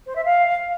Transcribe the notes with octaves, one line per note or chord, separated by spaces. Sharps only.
C5
E5
F5